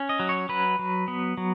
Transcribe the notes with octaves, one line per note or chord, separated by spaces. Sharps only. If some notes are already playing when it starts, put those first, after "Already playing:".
Already playing: C#4
D#5
F#3
C#5
F#3 B4
F#3
B3
F#3